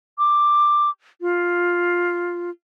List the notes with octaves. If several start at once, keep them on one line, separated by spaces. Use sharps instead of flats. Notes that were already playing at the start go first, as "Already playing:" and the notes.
D6
F4